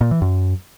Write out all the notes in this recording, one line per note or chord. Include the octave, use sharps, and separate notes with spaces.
A#2
E3
F#2